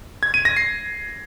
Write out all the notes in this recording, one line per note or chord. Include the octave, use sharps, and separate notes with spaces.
G#6
D#7
A#6
C7